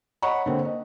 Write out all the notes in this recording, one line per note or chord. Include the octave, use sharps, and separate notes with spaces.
C#5 D#5 F#5 A#5 B5 C#6
D3 A#3 C4
D#5